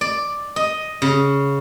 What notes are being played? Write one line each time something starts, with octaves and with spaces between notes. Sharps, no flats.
D5
D#5
C#3